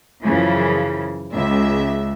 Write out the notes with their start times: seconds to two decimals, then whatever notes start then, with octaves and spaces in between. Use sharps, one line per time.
0.23 F#2 C#3 E3 F3
1.34 C#2 E5